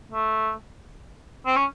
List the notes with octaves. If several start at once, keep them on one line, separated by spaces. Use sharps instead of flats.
A3
C4
C#4